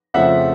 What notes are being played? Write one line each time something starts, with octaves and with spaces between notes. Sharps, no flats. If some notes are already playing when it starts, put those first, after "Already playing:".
F2 C#3 F3 A3 C4 E5 F#5